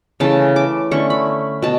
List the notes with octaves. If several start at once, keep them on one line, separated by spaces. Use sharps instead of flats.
C#3 E3 A3 A5
D6
D3 A3 C#4 C#6
B5
B2 A5